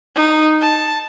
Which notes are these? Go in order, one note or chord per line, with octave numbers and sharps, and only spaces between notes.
D#4
A5